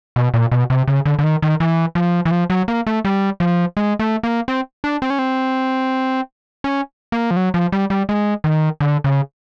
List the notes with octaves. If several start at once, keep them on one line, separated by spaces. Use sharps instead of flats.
B2
A#2
B2
C3
C#3
D3
D3
D#3
D#3
E3
F3
E3
F3
F#3
A#3
A3
G3
F3
G#3
A3
A#3
C4
D4
C4
C#4
C4
C#4
A#3
F3
F#3
F3
G3
G3
G#3
D#3
D3
C#3